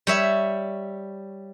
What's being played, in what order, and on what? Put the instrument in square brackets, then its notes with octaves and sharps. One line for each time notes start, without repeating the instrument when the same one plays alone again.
[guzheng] G3 C#5 E5